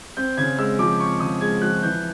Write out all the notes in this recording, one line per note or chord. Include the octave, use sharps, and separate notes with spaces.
C4 G6
C#3 G#6
G#3 E6
F3 D6
C4 C#6
C#3 D#6
G#3 G#6
F3 F#6
E3 G6